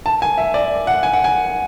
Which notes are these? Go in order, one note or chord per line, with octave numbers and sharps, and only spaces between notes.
A5
G#5
E5
D5
F#5
G#5
F#5
G#5